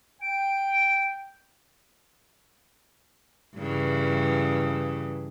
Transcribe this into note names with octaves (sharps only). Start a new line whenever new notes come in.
G5 D7
G2 C#3 E3